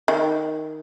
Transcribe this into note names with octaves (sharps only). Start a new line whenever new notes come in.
D#3